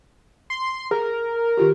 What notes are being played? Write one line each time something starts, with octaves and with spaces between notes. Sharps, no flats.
C6
G#4 A#4
D#3 F4 G4